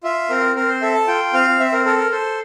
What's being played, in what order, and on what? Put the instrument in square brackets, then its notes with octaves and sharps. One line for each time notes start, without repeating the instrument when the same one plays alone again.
[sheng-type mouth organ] F4 E5
C4 A#4
C4 A#4
C5
A4 E5
A5
F4 G5
C4 F5
C4 E5
A#4
A4 A#4
A#4
A4 C5